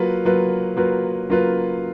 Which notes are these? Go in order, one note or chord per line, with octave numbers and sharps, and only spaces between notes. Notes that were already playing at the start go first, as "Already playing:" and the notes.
Already playing: F#3 A#3 F4 B4
F#3 A#3 F4 B4
F#3 A#3 F4 B4
F#3 A#3 F4 B4